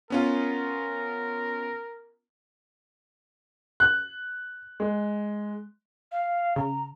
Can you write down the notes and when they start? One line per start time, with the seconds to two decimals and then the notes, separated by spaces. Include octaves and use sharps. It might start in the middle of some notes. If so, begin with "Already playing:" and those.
0.10 B3 C#4 F4 A#4
3.80 F#6
4.80 G#3
6.11 F5
6.56 C#3 A#5